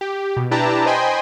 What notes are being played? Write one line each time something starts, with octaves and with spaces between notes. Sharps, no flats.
G4
B2
D4 E4 G4 B4 A5 A#5
C5 D#5 G5 G#5 B5 C6